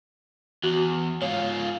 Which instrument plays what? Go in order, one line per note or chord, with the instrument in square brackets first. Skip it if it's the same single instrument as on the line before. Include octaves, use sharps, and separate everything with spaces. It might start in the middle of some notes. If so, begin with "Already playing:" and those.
[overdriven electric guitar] E2 [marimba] F#4
[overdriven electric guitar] G#2 F4 [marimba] C#5